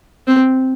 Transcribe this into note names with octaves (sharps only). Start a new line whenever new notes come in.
C4